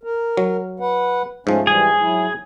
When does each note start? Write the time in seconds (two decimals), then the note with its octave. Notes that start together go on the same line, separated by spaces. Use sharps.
0.03 A#4
0.37 F#3
0.80 B4 F#5
1.47 G#2 F3 A3 C#4
1.67 E3 G3 G#4
2.00 F#3 E4